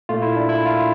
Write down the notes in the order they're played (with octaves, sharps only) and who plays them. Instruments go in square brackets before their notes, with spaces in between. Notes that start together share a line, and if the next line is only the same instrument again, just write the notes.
[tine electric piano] A#2 A3 F4
E4
D4
E4
F4